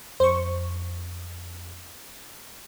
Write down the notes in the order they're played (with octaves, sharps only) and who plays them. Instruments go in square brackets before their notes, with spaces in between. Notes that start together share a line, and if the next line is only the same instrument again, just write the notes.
[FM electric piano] F2 [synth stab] C5 C#6